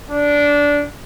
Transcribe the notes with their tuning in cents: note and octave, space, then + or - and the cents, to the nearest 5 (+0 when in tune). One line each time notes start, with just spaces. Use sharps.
D4 -15